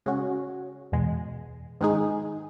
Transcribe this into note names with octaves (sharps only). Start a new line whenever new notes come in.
C#3 G#3 C#4 F#4
E2 B2 G#3
G#2 D#3 G#3 D#4 G#4